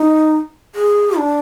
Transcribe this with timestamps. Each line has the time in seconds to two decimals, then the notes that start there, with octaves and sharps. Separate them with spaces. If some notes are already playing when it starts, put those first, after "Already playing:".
Already playing: D#4
0.75 G#4
1.17 D4